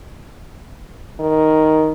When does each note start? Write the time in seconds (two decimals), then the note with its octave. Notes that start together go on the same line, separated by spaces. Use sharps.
1.19 D#3